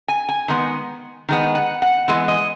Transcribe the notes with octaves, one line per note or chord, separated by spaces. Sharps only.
G#5
G#5
D#3 G#3 B3
D#3 G#3 B3
F#5
F#5
E3 G#3 B3
D#5